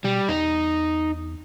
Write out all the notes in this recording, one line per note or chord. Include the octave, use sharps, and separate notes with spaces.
B2 G3
E2 D#4